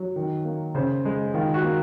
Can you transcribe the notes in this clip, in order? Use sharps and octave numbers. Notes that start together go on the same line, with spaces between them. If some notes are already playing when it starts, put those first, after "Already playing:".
Already playing: F#3
D#3
A#3
C#3 C5
G#3
D#3 F4
F#4
A#3